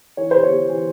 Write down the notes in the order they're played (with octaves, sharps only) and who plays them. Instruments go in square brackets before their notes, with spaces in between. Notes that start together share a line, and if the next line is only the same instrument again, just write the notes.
[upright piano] E3 C#5
C3 C5
C#5
C3
E3